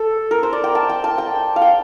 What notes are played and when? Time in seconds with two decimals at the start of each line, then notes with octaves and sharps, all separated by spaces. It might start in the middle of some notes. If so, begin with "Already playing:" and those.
Already playing: A4
0.31 A#4
0.43 C5
0.53 D5
0.64 G5
0.75 A5
0.89 G5
1.04 A5
1.18 G5
1.56 F5
1.62 G5